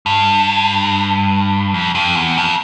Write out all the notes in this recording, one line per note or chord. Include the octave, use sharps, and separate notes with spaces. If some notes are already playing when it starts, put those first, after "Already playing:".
G2
F2
F2
E2
F2